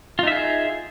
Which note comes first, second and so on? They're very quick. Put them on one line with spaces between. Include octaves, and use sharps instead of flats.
F4 D#4 E5 G#4